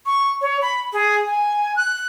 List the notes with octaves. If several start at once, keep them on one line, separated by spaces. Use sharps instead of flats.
C#6
C#5
B5
G#4
G#5
F#6